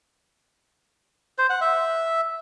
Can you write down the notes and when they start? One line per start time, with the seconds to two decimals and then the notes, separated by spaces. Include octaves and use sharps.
1.38 C5
1.50 F#5
1.61 E5